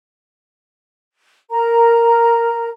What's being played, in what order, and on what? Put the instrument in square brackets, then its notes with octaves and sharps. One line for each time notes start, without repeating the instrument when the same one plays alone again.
[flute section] A#4 A#5